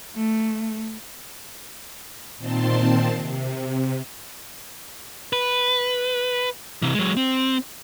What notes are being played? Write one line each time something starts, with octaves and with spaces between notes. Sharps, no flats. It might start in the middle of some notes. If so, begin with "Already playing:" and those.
A3
A#2 D#3 C4 A5 C6
C3
B4
C3 E3
F#3 G#3
C4